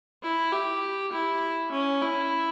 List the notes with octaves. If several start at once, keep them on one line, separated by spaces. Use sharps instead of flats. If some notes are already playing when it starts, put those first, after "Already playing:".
E4
G4
E4
C#4
E4